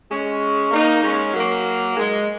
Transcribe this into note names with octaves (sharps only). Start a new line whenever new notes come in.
G#3 C#4
A#3 D#4
G#3 C#4
F#3 A#3
G#3